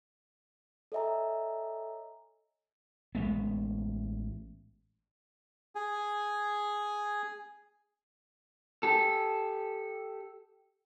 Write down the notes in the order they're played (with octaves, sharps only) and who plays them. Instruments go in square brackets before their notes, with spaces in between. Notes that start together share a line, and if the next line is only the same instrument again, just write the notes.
[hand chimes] A4 C#5 D#5 E5 G#5 A#5
[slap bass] A1 G#3 B3
[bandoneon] G#4 G#5
[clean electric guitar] G4 A4